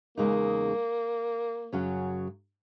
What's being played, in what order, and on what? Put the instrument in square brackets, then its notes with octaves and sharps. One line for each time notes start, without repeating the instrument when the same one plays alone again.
[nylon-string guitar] E2 C#3 G#3 D#4 [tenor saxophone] A#3
[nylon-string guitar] F#2 C#3 F#3 C#4